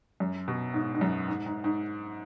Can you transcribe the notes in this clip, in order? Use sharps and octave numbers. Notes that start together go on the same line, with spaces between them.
F#2
B2
G#2
G#2
F#2
G#2
G#2
G#2